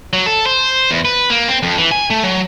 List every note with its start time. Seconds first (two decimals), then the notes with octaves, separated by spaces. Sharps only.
0.13 F#3
0.26 A4
0.46 C5
0.91 E2
1.05 B4
1.30 A#3
1.48 C4
1.63 F2
1.78 E3
1.92 G#5
2.10 A3
2.24 F#3